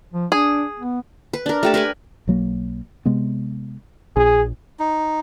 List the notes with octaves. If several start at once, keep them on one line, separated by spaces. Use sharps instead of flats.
F3
D4 G#4
B3
B4
D4 A#4
A3 G4 A5
A#4 B4 G#5 B5
B1 F#3 A#3
C3 G#3 B3
A#1 G#4
D#4